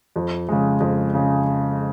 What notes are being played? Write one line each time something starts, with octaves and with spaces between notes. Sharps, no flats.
F2
C#3 G#3
F2
C#3 G#3